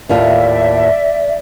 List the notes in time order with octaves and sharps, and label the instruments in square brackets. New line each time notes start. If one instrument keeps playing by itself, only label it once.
[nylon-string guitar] D#2 A2 F4 [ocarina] D5 [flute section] E5